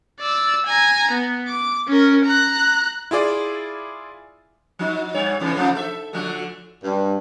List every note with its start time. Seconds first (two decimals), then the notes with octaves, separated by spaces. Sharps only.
0.20 D5 E6
0.66 G#5 A#5
1.11 B3
1.48 D6
1.88 C#4 A#4
2.25 A#5 F#6
3.11 E4 F4 G#4 D5
4.79 F3 D#4
5.14 G2 C#5
5.40 A2 C3 E3
5.55 C3 F3 A3
5.76 A4 E5
6.13 D3 F3 A3
6.84 G2